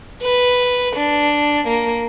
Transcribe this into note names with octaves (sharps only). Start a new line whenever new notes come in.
B4
D4
A#3